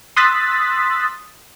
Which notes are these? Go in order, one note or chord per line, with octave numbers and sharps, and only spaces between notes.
C6 D#6 E6 F#6 A6 B6